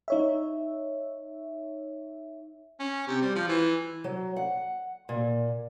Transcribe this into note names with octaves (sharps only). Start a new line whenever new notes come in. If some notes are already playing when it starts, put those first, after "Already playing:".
D#4 C#5 E5
C#4
C3
G3
F3
E3
F#3
F#5
A#2